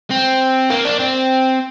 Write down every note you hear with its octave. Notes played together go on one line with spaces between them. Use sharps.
C4
A#3
D4
C4